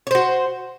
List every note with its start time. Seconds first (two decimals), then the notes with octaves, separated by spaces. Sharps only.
0.07 C#5
0.11 C5
0.15 F#4